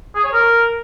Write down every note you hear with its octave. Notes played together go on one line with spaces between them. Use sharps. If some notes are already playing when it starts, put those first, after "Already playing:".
G#4
C#5
A#4